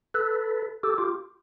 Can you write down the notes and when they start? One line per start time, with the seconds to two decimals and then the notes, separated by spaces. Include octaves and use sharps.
0.14 A4 B4
0.83 G4 A4
0.98 F4 G4